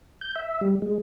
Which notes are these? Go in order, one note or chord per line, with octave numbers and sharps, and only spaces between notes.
G6
E5
G3
G#3